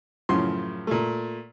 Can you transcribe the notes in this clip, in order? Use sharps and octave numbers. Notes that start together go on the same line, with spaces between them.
F#2 A2 C#3 F3 C6
A#2 A3